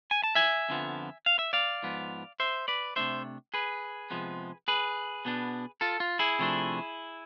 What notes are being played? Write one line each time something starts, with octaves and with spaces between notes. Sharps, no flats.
G#5
A5
E5 G#5
F2 D3 F3 B3
F5
E5
D5 F5
G#2 F3 B3
C5 E5
B4 D5
C3 E3 A3 D4 C5 E5
G#4 B4
C3 F3 G#3 B3
G#4 B4
B2 B3 D4
F4 A4
F4
E4 G#4
C3 F3 A3 D4